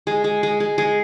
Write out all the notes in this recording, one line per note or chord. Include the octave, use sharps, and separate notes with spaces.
G#3
G#3
G#3
G#3
G#3